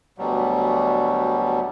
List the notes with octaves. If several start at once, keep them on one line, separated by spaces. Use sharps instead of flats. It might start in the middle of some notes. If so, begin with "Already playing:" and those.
D2 B2 F#3 G3